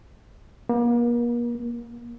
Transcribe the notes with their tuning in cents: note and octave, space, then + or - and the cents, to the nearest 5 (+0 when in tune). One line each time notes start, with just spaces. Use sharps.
A#3 +40
A#3 +15